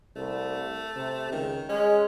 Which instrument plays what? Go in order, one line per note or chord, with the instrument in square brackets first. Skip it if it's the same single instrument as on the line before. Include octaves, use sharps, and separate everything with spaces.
[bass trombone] C2 [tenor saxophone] A3
[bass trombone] C3
[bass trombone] C#2 [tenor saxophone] D#3
[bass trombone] G#3 [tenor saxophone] C#4